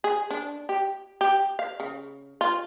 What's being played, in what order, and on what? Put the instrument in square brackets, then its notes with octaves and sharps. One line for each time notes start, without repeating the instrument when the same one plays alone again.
[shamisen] G#4
D4
G4
G4
F5
C#3
F4